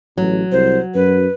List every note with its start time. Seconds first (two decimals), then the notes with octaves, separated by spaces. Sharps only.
0.18 A1 F#3
0.52 C2 C5
0.95 F#2 B4